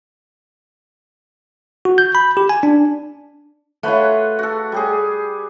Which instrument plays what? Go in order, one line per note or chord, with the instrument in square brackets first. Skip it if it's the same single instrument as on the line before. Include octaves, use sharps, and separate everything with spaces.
[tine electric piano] F#4
G6
B5
G4
G#5
D4
[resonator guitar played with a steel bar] A3 F4 [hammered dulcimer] B4 C#5 F#5
[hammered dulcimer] F#4 A4
G3 G4 G#4